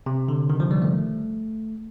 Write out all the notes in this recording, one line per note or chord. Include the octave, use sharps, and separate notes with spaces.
C3
D3
D#3
F3
G3
A3